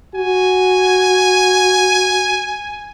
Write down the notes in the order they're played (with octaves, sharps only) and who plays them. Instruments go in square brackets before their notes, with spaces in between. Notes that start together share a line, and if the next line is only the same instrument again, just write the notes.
[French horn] F#4 [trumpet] G#5